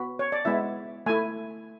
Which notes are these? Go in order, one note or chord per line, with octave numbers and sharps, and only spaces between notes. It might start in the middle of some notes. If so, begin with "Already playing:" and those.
Already playing: B3 F#4 B5
C#5
D5
G#3 B3 E4 E5
A3 E4 G#5